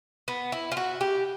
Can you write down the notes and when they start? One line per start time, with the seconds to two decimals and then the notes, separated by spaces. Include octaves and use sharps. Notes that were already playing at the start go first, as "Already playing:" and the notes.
0.28 B3
0.52 E4
0.72 F4
0.77 F#4
1.01 G4